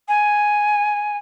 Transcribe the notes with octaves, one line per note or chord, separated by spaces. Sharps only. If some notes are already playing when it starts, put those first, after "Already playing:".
G#5